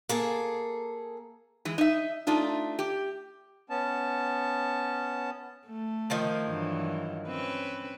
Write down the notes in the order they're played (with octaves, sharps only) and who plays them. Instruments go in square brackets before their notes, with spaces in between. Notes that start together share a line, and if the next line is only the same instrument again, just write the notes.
[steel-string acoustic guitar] A#3 G#4 A4
[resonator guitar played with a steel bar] E3 G#3
D#4 E5
A3 D4 D#4 F4
G4
[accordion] B3 C#4 A5
[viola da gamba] A3
[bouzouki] D#3 F3 A#3
[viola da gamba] G2 E3 F#3
C4 C#4 B4